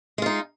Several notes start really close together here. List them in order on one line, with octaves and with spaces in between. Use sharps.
G#3 F4 D#4